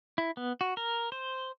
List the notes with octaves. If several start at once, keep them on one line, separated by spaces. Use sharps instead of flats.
E4
B3
F#4
A#4
C5